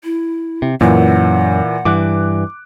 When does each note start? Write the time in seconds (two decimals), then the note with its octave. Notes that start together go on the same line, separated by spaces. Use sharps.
0.04 E4
0.62 C3
0.81 F#2 A#2 E3 F#5
1.85 G2 E3 D6 F#6